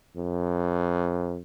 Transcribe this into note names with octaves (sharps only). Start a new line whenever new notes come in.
F2